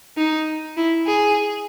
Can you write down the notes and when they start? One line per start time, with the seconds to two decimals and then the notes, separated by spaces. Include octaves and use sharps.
0.18 D#4
0.77 E4
1.07 G#4